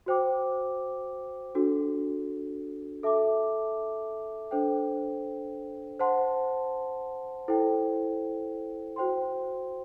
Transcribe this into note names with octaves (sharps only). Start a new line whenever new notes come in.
F#4 C5 G5 D6
D4 F#4 A4
A4 E5 A5 D6
D4 A4 C5 G5
C5 F#5 A5 C6
E4 A4 C5 G5
F#4 C5 G5 C6